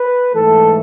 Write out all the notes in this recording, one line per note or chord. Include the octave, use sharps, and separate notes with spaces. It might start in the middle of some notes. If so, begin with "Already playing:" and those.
Already playing: B4
G#2 E3 A3 A4